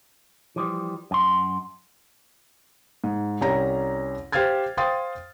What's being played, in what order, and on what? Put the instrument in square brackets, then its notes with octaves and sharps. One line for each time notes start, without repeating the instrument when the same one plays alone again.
[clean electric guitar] E3 F3 G3
F#2 C6
[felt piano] G#2
C2 C#4 G4 A#5 A#6
G4 C5 F5 F6 G#6 A6
C5 F5 G5 C6 D#6 A6